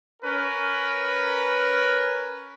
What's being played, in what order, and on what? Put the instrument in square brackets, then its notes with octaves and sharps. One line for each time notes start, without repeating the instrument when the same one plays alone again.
[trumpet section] C#4 A#4 B4